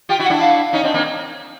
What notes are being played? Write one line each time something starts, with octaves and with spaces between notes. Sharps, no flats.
F4 G4 G5
E4 F#4
F#5
D4 E4
F5
C#4 D#4
C4 D4
A#3 C4